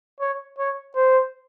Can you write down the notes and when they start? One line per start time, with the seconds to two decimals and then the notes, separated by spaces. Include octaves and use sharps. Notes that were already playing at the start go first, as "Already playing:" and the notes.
0.20 C#5
0.59 C#5
0.95 C5